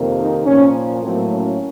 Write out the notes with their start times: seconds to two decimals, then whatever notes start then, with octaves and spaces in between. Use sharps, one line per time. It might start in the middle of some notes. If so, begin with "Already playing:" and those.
Already playing: F2 C3 D#3 A#3
0.18 D#4
0.46 A#2 F3 A#3 C#4
1.02 A2 F#3 A#3 C4
1.30 C#4